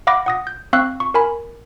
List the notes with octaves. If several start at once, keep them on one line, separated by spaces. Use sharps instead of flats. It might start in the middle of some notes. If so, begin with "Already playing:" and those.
F5 F#5 B5 D6 A#6
F#5 D#6 A#6
G6
C4 F5 C#6 E6 F#6
C#6
A#4 G#5 B5